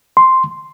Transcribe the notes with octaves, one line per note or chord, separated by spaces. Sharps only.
C6